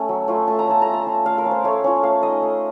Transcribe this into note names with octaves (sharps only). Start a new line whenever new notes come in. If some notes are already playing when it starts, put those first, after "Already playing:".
Already playing: A3 C#4
F#3
A3 C#4 F4
A3 A5
A#5
C#4 F4 A5
A3 A#5
A5
C#4 F4
A3 F5
A#4
C#4 F4
C5
A3 C#5
C#4 F4 C#5
A3 F5
D#4 D#5
A3